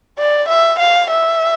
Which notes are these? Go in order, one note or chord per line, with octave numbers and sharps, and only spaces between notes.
D5
E5
F5
E5